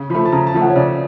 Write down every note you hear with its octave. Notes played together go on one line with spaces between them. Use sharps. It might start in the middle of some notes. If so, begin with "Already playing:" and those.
Already playing: C#3
F3 A3 B5
A5
C#3 A#5
A5
F3 A3
F#5
C#5
C#3 D5